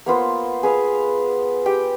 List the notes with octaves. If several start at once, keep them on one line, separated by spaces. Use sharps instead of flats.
A#3 B3 F4 C5
G#4 B4 F5
G4 G5